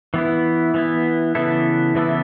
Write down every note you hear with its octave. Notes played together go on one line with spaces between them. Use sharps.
E3 B3 E4
E3 B3 E4
C#3 E3 B3 E4 A4
C#3 E3 B3 E4 A4